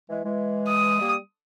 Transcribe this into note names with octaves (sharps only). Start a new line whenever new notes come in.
E3 G#3
E3 G#3
D#6
G3 A#3